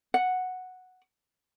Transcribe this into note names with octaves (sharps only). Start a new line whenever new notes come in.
F#5